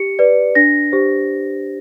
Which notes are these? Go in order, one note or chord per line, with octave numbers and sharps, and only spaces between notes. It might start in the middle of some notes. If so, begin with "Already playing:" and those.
Already playing: G4 C#7
B4 D5
D4 A#6
G4 C5